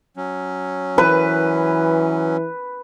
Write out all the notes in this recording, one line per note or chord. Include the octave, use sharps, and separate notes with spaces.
F#3 C#4
E3 B4